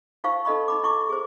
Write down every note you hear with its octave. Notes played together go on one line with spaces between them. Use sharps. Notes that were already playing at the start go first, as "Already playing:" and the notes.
D#4 F4 C5 F5 C#6
D#4 A4 D#5 B5 C#6
D#4 B5 D6
E4 C#6 D6
G#4 C5